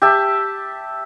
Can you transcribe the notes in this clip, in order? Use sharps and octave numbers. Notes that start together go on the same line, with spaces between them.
G4 E5 A5